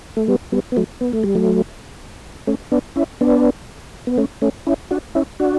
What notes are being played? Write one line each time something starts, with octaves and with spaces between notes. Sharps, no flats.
A3
G3 B3
G3 B3
B3
F#3 A3
B3
A3
G3
F#3 A3
A3 C#4
B3 D4
C#4 E4
B3 D4
B3
A3 C#4
A3 C#4
C#4 E4
D4 F#4
C#4 E4
D4 F#4